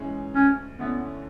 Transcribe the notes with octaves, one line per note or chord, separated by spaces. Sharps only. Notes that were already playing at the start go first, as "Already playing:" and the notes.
Already playing: G#2 E3 G#3 C#4
D2 C#4
D3 A3 B3 C#4 E4